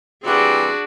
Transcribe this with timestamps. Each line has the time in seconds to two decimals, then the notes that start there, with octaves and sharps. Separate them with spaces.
0.24 E3 G3 C4 D4 F#4 G#4